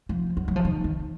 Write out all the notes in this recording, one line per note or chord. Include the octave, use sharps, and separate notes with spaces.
F3
F#3
F#3
F3
D#3
D#3